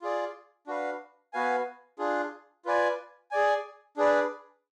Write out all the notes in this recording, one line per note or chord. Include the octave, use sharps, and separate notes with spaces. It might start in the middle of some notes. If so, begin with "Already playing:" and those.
F4 G#4 D5
D4 F#4 B4 F5
B3 F#4 B4 F5 G#5
D4 F4 G#4
F4 B4 D5 G#5
G#4 D5 G#5
D4 G#4 B4 D5